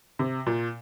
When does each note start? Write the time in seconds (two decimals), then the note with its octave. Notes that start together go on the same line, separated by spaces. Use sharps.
0.19 C3
0.47 A#2